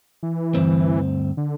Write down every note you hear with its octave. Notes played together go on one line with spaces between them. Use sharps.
E3
D2 G2 C4
D3